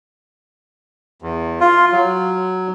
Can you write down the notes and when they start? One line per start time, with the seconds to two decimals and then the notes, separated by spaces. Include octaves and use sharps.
1.22 E2
1.60 F4
1.92 F#3